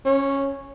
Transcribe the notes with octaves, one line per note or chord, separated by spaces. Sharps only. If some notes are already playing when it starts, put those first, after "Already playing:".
C#4